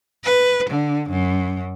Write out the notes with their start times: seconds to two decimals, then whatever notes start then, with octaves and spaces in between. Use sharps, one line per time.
0.24 B4
0.70 D3
1.10 F#2